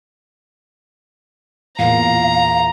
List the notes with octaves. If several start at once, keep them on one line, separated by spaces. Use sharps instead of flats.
E2 A#2 F5 A#5